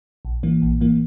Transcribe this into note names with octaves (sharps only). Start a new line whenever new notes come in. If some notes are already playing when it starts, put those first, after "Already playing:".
A#1
A2 E3 A#3
A#1
A2 E3 A#3